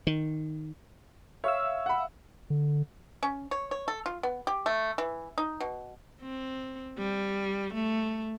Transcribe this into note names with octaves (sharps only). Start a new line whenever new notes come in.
D#3
C#5 E5 F5 E6
F#5 B5
D3
C#4
C#5
C#5
A4
F4
B3
G4
A3
E3
D#4
B2
C4
G3
A3